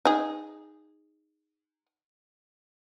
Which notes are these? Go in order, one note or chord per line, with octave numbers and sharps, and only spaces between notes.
D#4 G#4